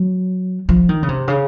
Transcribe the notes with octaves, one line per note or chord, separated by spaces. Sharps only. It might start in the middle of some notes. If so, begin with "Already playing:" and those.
Already playing: F#3
F3
D#3
C#3
C3
C#3